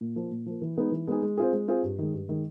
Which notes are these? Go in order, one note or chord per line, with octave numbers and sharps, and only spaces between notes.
A#2
F3 A#3
A#2
F3 A#3
E3
G#3 B3 D#4 G#4
E3
G#3 B3 D#4 G#4
G#3
C4 F4 G#4
G#3
C4 F4 G#4
G2
D#3 G#3
G2
D#3 G#3